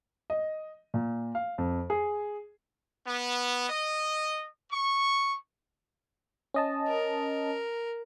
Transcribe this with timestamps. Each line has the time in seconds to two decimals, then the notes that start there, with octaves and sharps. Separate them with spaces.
0.30 D#5
0.94 A#2
1.35 F5
1.58 F2
1.90 G#4
3.07 B3
3.69 D#5
4.72 C#6
6.54 C#4 D#5 A5
6.88 A#4